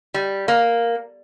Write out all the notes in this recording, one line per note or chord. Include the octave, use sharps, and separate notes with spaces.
G3
A#3